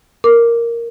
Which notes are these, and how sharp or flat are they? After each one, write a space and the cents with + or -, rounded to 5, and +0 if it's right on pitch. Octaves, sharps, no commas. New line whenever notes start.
A#4 +0 D6 -5